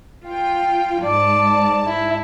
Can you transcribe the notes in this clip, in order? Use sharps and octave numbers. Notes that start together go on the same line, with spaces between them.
F4 G5
G#2 D5 A5
E4